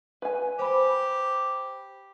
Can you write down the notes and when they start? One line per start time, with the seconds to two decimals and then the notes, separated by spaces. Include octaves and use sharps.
0.22 B4 G#5
0.59 G4 C5 B5